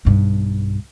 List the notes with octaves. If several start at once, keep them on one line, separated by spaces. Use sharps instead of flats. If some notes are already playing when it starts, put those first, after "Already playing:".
B1 G2